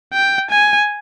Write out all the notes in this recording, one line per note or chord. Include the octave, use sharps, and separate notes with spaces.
G5
G#5